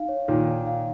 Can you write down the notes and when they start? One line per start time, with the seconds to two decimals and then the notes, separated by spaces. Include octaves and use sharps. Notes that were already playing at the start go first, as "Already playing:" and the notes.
Already playing: D#4 F5
0.09 C#5
0.28 A#2 D#3 D#4
0.47 D#4
0.67 F5